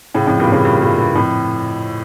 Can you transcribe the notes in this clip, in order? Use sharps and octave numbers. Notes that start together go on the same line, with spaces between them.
A2 C#3
F2 A2
G2 A#2
A2 C#3
G2 A#2
G2 A#2
G2
F2 A2